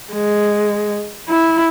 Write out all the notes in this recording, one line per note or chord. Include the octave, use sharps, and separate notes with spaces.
G#3
E4